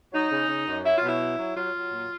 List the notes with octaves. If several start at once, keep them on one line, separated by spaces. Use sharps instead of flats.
F#3 D#4
C#3
C#3
F#2
F#3 E4
F4
B2
E4
F#3
F#3
F#3 F4
F#3
A#2